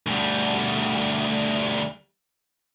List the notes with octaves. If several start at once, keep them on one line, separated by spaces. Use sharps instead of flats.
D2 G3